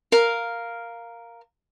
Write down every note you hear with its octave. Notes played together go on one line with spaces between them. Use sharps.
A#4 F5